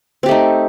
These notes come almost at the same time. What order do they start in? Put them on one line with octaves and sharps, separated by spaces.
C4 G4 A3 D#4